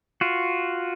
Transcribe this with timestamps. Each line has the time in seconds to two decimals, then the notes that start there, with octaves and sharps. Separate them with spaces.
0.21 F4 F#4